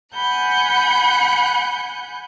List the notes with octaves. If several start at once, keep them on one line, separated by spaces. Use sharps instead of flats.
F#5 G#5 B5 F#6 G6